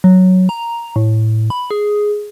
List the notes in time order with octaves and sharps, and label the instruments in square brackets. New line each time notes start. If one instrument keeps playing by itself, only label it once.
[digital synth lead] F#3
A#5
A2
B5
G#4